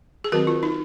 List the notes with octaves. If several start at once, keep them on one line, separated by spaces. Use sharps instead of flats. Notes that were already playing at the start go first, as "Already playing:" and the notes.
G#4
D#3 F#3 C4 F#4 A#4
F4
D#4